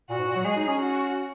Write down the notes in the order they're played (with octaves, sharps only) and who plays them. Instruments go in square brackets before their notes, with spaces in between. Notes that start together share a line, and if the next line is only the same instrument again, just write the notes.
[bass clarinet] A#2 [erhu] F#4
[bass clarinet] G#2
A#2
F#3
[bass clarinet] G#3 [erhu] G#4
[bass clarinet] D#4
C#4
[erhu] F#4